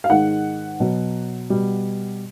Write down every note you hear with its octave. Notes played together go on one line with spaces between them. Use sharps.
F5
G#2 D#3 G#3 F#5
B2 F#3
B2 G3